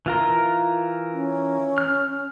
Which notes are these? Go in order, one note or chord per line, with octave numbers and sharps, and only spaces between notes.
E3 F4 A#4
C#4
F6